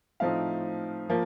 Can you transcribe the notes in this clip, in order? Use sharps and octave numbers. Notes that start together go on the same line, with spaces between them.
A2 F3 A3 C4 D#4 F5
F3 A#3